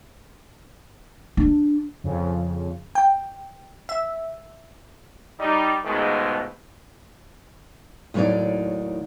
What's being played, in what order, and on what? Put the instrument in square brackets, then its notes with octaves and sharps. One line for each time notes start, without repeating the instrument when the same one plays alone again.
[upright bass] D4
[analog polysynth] F2 C#3
[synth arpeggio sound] G5
E5
[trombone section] G3 D#4
C#2 G#2 B2 D#3 G#3 A3
[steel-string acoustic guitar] D#2 A2 F#3 G3 D#4 D5